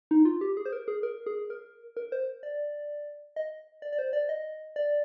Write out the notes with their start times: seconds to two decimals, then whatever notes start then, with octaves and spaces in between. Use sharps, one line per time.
0.11 D#4
0.25 F4
0.41 G4
0.57 G#4
0.66 C5
0.72 A#4
0.88 G#4
1.03 A#4
1.26 G#4
1.50 A#4
1.97 A#4
2.12 C5
2.43 D5
3.36 D#5
3.82 D5
3.92 D5
3.99 C5
4.13 D5
4.29 D#5
4.76 D5